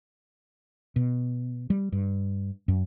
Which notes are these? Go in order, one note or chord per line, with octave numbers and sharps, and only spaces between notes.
B2
G3
G2
F#2